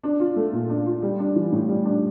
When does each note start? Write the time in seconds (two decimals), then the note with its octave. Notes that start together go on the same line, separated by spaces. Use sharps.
0.03 D4
0.20 F4
0.36 A3
0.53 A#2
0.69 D4
0.86 F4
1.02 G3
1.19 D4
1.36 E3
1.52 A2
1.69 G3
1.85 D4